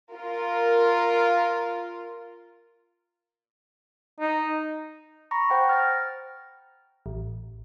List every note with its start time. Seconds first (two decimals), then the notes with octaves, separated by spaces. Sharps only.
0.13 F4 A#4
4.20 D#4
5.31 A#5 B5 C#6 A#6
5.50 C5 F#5 G5
5.69 F6 A6 A#6
7.06 A1